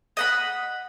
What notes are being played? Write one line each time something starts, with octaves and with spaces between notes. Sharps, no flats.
D#5 F#5 B5